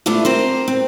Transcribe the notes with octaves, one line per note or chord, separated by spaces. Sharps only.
A3 B3 D4 E4 F4
C4 A#4 C5
C4